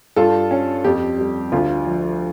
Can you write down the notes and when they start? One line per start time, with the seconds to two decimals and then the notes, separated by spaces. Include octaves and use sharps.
0.16 G2 F4 A4
0.51 C#4
0.84 F2 G4
1.18 G3
1.52 D2 F4
1.86 F3